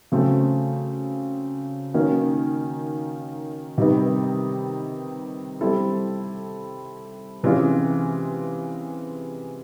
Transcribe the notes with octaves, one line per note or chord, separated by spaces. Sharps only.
C#3 F#3 A3 C4
D#3 F#3 A#3 C#4
C3 D#3 G3 B3 D#4
G3 C4 E4 A4
C3 E3 G#3 C#4 F4